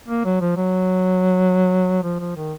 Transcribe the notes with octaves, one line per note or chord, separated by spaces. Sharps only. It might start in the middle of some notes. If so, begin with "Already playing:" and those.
A#3
F#3
F3
F#3
F3
F3
D#3